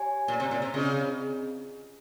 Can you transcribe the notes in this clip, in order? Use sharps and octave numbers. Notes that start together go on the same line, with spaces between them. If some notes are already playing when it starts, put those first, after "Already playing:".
Already playing: G4 C#5 G#5
A#2
C3
A#2
C3
C#3 C4 F4 G#4 D#5